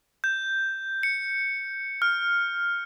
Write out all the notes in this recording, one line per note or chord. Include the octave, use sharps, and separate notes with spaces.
G6
C#7
F6